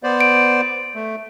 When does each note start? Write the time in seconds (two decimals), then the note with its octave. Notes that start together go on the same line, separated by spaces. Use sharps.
0.03 B3 C5 D5
0.21 D7
0.95 A3